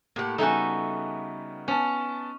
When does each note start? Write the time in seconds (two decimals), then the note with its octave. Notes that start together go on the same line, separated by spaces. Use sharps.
0.16 A2 A#3 G4 F#5
0.38 C#3 G3 B3 D#4 F#4 A4 E5 G#5
1.68 B3 C#4 A5